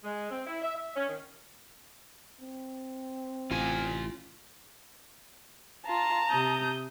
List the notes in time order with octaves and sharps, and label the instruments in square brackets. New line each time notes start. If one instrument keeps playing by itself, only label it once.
[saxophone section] G#3
C4
E4
E5
E5
C#4
D#3
[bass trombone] C4
[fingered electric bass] A1 [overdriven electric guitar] F4 G#5
[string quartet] F4 [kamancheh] A5 A#5
[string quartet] C3 D#6 G6